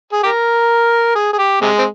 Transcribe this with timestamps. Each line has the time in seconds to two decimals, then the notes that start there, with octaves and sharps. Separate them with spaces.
0.12 G#4
0.23 G4 A#4
1.15 G#4
1.33 G#4
1.38 G4
1.61 C3 G#3
1.78 C4